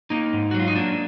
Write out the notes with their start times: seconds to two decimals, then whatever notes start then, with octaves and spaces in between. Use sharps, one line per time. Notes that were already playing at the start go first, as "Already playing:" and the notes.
0.10 A#3 D#4
0.33 G#2
0.51 F#4
0.54 F#3
0.60 F4
0.68 D#4
0.76 A#3 D4